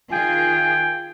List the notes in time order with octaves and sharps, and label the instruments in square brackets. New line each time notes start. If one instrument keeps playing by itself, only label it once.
[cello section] D#3 F4 G#4 [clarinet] G5 [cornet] G#5